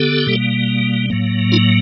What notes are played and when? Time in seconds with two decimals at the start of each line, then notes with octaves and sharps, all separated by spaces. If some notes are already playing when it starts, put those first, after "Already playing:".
Already playing: D3 B3 G4 A4
0.27 B2 G3 A#3
1.10 A2 F#3 A#3
1.52 D#4 F4